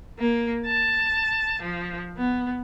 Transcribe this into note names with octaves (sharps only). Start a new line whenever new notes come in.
A#3
A5
F3
B3